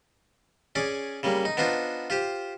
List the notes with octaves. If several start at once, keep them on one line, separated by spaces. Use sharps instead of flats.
C#4 G#4 D5
C#3 G3 A#3
D#4
B3 D4 D#4 F4 C5
F4 G4 C5